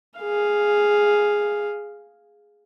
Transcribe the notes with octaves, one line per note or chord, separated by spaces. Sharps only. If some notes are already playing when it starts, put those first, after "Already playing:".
G#4 F5